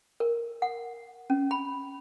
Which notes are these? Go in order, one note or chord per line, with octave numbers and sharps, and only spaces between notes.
A#4
F#5
C#4
B5